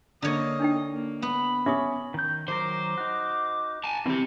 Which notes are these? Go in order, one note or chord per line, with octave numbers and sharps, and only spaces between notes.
D3 A#3 C#5 D#5
D4 D#4 G5
A#3
B3 B5
C#4 E5 D6 D#6
D#3 G6
D#3 F#3 A#4 C5 D6
D#4 F#4
G#5 A5
D#3 E3 G3 C4 G4